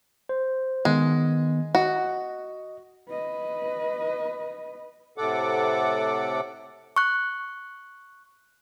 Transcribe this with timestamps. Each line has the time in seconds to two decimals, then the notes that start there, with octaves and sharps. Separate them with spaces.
0.29 C5
0.85 D#3 G#3 B3
1.75 F#4 D#5
3.09 B4 D#5
5.18 A2 C3 A4 F#5 D6
6.96 C#6 F#6